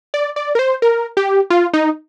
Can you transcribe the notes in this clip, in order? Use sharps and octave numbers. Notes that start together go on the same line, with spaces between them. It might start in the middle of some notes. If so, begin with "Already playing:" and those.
D5
D5
A#4
C5
A#4
G4
F4
D#4